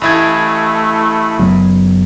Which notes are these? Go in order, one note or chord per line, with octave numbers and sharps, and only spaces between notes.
A1 A3 E4 B5 G#6
F#1 F#3 B3